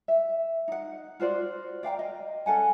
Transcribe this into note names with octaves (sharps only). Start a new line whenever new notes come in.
E5
D#4 F#5
F4 F#4 C5 D5
D5 F5 G5 A#5
D#5
C#4 A4 F#5 G#5